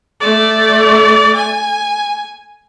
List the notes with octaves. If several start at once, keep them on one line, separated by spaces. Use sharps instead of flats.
A3 D5
G#5